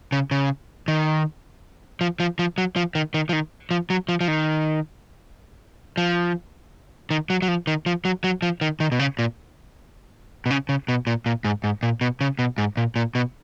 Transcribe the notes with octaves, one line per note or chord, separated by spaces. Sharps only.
C#3
C#3
D#3
F3
F3
F3
F#3
F3
D#3
D#3
F3
D#3
F3
F#3
F3
F3
D#3
F3
D#3
F#3
F#3
F3
D#3
F3
F#3
F#3
F3
D#3
D#3
B2
C#3
A#2
B2
C#3
C#3
B2
A#2
A#2
G#2
G#2
A#2
B2
C#3
B2
G#2
A#2
A#2
B2